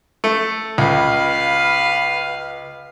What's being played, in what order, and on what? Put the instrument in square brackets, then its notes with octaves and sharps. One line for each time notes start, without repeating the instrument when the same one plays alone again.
[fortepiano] A3
[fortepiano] C#2 [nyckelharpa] B4 F5